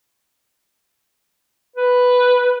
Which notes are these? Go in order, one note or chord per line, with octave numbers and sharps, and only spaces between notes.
B4